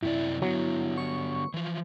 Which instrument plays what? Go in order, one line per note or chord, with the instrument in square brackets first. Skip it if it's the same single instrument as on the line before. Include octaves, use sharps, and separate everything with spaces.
[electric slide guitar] F#2 C3 D5 [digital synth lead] E4
[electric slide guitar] D3 B3 [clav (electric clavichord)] F#3
[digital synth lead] C#6
[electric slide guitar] E3 F3